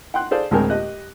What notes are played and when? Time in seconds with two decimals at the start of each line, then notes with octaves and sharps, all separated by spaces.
0.14 F#5 G5 C6 F#6
0.31 G#4 A4 C5 D5 F5
0.51 D2 A2 G#3 C4 A#4 G#5
0.70 G4 D#5 F#6